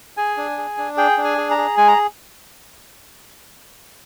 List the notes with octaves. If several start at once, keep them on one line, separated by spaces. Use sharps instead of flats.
G#4 G#5
D4
G#4
D4
G#4 G5
D4
G#5
G#4
A#5
G#4
G#3 G#5
A#5